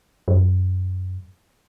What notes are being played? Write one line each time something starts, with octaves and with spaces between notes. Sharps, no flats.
F#2